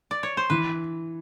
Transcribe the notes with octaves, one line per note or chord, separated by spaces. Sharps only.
D5
C#5
C5
E3 B4